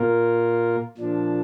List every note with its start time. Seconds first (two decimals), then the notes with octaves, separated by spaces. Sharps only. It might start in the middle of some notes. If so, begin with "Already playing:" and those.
Already playing: A#2 A#3 F4 A#4
0.98 A#2 F3 D4